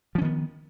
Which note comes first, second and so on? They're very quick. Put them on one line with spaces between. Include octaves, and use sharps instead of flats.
F3 C#4 D#3 B3